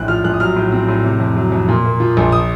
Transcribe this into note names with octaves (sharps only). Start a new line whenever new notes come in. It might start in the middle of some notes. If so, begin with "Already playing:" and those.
Already playing: A#1 A2 F#6
F3 F6
A#1 F#6
D#6
F#3 F6
A2
C4
A2
C3
F2
F#3
F2
A#2
A#3
F3
A#1
D#6